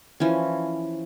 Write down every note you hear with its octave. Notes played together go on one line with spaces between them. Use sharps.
E3 F3 C#4